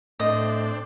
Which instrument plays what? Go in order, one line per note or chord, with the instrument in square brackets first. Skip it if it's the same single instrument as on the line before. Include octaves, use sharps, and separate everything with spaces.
[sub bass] A2 [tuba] A3 [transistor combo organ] C4 D4 [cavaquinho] D#5